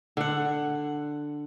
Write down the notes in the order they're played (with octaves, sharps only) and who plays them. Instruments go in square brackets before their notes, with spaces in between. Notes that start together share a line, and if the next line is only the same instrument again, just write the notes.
[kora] D3 F#5